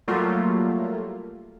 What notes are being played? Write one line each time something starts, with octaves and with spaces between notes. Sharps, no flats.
F#3 G3 A3 A#3 F4